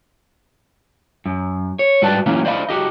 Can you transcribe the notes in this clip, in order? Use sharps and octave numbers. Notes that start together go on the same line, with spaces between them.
F#2
C#5
G#2 G3 F#4 B4 D5 A5
E3 F#3 A#3 C#4
C5 D5 D#5 F5 B5
F#4 G4 D#5